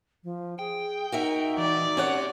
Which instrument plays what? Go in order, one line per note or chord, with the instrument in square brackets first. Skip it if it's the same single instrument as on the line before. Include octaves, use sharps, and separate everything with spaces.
[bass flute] F3
[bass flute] G#4 [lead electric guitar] G5
[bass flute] D#4 [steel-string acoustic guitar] F#4 A#4 E5
[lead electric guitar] E3 [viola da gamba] D5
[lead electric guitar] C4 G4 [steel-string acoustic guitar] C#4 C#5 F#5